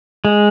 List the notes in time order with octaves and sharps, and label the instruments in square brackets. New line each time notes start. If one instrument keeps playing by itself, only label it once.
[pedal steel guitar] G#3